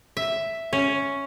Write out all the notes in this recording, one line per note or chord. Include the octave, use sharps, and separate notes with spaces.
E5
C#4